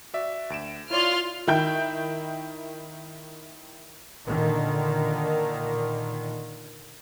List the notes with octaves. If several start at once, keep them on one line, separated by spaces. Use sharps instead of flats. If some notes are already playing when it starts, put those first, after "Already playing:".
F#4 D5 E5
D2 D7 E7
E4 F4 C#5 D5 C6 F6
D#3 E4 G5 G6
A#2 D3 D#3